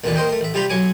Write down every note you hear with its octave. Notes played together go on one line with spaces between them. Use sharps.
A1 D#2 B2 E3 B4 D5
A#3 C5 D#5 G5
A3 A#4
A1 E5
C3 G3 F4 G4 A#5 B5
B1 F#3 C#5 G#5 D6